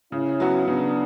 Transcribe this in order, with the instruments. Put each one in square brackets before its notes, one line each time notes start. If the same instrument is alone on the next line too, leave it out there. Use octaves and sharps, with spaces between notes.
[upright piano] C#3 [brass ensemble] C#4 E4
[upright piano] F#3 B3 F#4
[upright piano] C#3 [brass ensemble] B3 D4